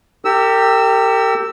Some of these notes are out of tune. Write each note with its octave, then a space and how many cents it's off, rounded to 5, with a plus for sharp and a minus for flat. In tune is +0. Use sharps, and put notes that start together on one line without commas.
G4 +0 A#4 -40 E6 +0